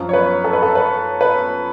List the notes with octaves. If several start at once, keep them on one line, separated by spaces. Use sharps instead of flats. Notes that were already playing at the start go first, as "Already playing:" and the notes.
Already playing: F#2 F3
C#5
B4
A4
B4
A4
B4
B4